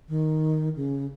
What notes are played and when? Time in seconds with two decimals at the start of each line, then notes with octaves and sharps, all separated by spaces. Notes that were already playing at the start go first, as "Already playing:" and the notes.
0.09 D#3
0.76 C#3